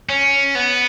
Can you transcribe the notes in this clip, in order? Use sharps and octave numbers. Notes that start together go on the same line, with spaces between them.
C#4
B3